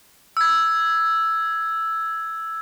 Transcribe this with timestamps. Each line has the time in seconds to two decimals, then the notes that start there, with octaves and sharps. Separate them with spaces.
0.37 E6 G#6